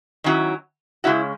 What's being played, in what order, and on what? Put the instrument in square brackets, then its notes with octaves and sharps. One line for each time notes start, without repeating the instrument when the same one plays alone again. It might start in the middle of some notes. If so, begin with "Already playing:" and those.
[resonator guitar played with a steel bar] D#3 F#3 C#4 E4
C#3 G#3 C#4 E4 F#4